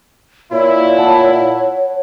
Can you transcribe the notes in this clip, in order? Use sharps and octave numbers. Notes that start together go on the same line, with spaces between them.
A#2 E4 C#5
F#5 A5